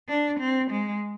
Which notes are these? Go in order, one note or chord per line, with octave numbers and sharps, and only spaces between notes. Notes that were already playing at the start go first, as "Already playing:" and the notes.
D4
C4
G#3